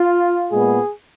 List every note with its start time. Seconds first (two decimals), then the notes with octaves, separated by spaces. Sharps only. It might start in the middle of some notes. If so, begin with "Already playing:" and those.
Already playing: F4
0.51 A#2 G#3 B3 G#4